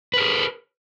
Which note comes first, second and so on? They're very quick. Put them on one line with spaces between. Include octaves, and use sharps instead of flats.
B4 A#4 G#4